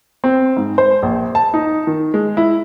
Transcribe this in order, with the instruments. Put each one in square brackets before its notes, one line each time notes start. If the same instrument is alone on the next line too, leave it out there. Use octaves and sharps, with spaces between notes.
[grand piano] C4
G#2
C5
A#1
A5
D#4
D#3
G#3
E4